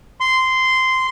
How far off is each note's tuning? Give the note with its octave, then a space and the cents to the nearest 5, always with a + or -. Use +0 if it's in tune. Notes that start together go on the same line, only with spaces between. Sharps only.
C6 -10